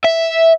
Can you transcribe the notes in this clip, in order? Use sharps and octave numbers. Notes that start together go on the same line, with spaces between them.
E5